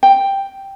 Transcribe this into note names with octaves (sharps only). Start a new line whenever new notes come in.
G5